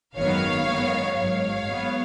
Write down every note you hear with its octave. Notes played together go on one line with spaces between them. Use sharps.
G#1 F#2 D#3 F#3 B3 C#5 F5
F#2 D#3 G#3 B3
G#1 G#2 F#3 C#5 F5
G#2 F#3 B3